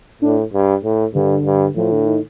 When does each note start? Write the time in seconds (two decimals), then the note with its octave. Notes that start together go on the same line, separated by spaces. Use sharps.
0.22 A2 D4
0.53 G2
0.84 A2
1.15 G2 D3
1.45 G2
1.76 A2 F3
1.92 D3
2.06 D#3